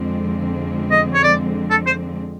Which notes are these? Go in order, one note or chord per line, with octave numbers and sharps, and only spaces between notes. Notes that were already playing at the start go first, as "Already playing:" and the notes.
Already playing: F2 D3 F3 G#3 C4
D#5
C#5
D5
A4
C5